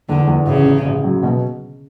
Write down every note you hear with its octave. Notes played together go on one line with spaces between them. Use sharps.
E2 D3
E2
A1 C#3
A1
A1
F#3
B2